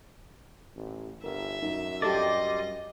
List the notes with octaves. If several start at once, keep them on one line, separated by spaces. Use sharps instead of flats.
A1
G1 A#4 E5
F#2 D#4
G3 F4 G4 A4 D5 D#5